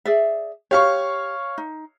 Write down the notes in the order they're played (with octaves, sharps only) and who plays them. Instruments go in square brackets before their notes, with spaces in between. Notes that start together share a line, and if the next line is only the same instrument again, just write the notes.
[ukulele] G#4 D5 E5
[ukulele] G4 [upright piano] C#5 F5 C#6
[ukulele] D#4